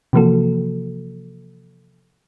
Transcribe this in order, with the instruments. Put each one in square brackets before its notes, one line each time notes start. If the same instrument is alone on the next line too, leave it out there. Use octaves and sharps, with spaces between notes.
[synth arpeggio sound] C3 E3 F3 A#3 F#4 A4